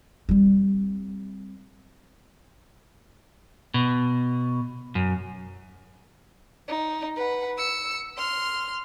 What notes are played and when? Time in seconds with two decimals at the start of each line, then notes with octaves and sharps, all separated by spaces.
0.29 G3 C4
3.74 B2
4.95 F#2
6.68 D#4
7.16 B4 F#5
7.58 E6 C#7
8.17 C6 F6